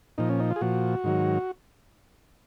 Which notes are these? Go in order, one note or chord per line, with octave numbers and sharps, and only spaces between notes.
A#2 F3 D#4
C#4
D#4
F4
G#4
A#2 F3 F#4
G#2 D#3 F#3